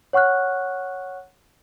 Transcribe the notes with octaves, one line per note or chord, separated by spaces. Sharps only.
C#5 F#5 C#6 F6 F#6